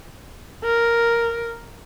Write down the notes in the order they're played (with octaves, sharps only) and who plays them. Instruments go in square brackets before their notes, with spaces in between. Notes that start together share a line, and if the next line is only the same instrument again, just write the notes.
[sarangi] A#4